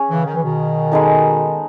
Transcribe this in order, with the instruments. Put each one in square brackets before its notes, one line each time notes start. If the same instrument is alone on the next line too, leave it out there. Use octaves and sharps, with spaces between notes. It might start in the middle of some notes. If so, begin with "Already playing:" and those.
Already playing: [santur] C#4 G#4
[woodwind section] C#3 E3
D#3
E3
B2 D#3
[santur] G#3 B3 D#4 A4